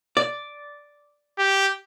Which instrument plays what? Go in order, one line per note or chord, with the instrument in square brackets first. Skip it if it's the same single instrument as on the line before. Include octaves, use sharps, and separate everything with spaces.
[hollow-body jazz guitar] D5
[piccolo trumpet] G4